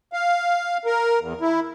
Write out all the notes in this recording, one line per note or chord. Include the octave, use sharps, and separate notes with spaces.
F5
A#4
E2
E4